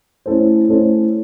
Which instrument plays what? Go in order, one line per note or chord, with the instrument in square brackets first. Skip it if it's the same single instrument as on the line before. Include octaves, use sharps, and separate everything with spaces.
[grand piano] A3 C#4 E4 A4 C5
A3 C#4 E4 A4 C5